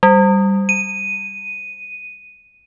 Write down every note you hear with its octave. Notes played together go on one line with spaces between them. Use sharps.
G3
D#7